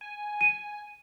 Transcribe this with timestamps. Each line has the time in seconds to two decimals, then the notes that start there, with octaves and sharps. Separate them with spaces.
0.01 G#5
0.41 D#7